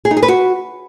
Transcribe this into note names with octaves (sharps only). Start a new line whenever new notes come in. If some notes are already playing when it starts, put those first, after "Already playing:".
G#4
D#4
G#4
B4
F#4